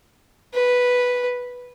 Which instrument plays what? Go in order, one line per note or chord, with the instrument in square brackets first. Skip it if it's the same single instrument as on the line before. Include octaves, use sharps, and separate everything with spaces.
[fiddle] B4